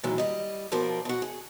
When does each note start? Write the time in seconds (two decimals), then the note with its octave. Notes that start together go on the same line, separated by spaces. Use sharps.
0.03 A#2 D#3 E3 F#3 G#3
0.18 G3 D#5
0.72 D#2 B2 F3 F4 A#4 D5
1.05 B2 F#4
1.22 G#4